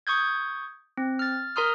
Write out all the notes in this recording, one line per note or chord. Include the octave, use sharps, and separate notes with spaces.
C#6 D#6 G6 G#6
C4
F6 A6
A#4 A#5 C6 D#6 F6